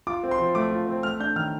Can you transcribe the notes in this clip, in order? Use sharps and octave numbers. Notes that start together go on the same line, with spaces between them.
F4 D6
C4
C6
F3
A3 D6
F4
C4
A3 F6
D4 G6
D#3 F6